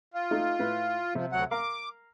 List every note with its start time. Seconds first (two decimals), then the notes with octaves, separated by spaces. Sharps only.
0.14 F4
0.31 A3 D#4
0.59 A2 B4
1.15 C3 F3
1.32 D2 F#3 F#5
1.51 A#4 F5 A#5 D6